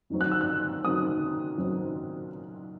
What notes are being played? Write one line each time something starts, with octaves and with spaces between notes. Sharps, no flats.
F#2 D#3 F#3 C4
F#6
E6
F#6
F#2 D#3 F#3 C4 D#6
F#2 D#3 F#3 C4